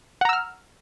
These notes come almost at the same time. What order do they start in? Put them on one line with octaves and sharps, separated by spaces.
F#5 A#5 E6 F6